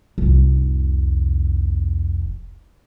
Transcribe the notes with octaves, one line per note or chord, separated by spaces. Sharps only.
F1 C2